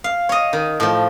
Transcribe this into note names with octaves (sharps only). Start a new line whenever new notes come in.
F5
C#5 D#5
D#3
A2 F3